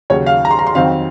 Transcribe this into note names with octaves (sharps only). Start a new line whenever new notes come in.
D#2 C#3 F#3 C#5
F5
A#5
C6
A#5
C6
F2 D#3 F#3 C4 D#4 F5